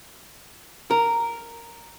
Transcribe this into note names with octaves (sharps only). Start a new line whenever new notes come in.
A#4